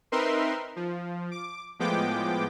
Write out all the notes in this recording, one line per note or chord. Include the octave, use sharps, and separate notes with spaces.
C4 D#4 A#4 B4 E5 C6
F3
D6
A2 F3 G#3 B3 G5 D6